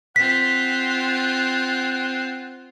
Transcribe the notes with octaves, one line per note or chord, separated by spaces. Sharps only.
C4 F4 F#5 B6